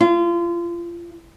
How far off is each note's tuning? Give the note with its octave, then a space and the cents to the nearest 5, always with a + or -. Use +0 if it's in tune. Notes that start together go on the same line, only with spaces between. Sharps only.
F4 -30